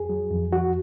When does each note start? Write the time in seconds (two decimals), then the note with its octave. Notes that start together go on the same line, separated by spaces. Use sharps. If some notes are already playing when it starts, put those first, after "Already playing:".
Already playing: F2 G#4
0.09 F#3
0.31 F2
0.53 F3 F#4